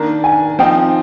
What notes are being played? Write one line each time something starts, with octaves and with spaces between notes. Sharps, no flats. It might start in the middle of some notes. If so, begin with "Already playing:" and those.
Already playing: D#3 A#3 D4 A#5
G#5
F3 C4 D#4 G5